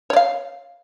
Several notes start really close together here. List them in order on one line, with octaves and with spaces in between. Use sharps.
C#5 D5 F5